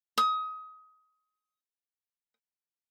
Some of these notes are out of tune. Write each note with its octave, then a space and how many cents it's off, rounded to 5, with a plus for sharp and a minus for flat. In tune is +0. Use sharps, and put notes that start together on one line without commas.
D#6 +25